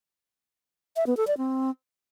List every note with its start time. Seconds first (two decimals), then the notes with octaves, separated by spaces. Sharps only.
0.96 E5
1.07 B3
1.17 A4
1.27 D5
1.38 C4